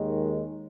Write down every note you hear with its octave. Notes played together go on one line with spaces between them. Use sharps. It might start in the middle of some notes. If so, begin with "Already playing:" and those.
Already playing: D#2 D#3 G#3